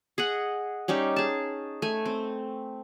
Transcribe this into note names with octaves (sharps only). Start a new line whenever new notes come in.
G#4 D#5 F#5
G3 C#4 D#4 G4
G#4 A5
A3 G#5
C4